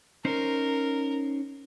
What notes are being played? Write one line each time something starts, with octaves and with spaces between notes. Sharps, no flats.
C#4 D#4 A#4 C5